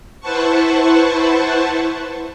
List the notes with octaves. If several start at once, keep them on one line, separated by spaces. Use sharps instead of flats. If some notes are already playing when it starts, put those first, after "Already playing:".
E4 B4 C5 F#5 A5 C#6